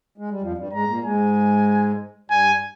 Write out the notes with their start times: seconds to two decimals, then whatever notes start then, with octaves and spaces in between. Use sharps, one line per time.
0.18 G#3
0.30 G3
0.42 F2 F3
0.57 G2 G3
0.73 G#2 G#3 A#5
0.89 A#2 A#3
1.04 G#2 G#3 G#5
2.30 G2 G3 G#5